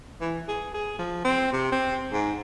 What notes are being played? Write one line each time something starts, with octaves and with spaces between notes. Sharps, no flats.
E3
G#4
G#4
F3
C4
C3
C4
G#2